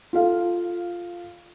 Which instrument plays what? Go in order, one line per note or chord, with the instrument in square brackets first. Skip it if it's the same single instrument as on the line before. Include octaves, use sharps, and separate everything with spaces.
[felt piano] F4 A4 F5